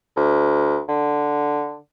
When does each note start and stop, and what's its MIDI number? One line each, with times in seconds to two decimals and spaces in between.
0.16 0.80 38
0.88 1.76 50